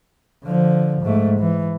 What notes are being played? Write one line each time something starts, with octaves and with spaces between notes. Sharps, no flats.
D3 F3
G#2 A3
E3